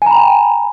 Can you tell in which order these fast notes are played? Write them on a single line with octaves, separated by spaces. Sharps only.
G#5 A#5 B5 G5